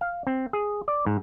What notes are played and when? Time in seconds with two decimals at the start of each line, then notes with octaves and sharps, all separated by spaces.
0.01 F5
0.27 C4
0.53 G#4
0.88 D5
1.06 G#2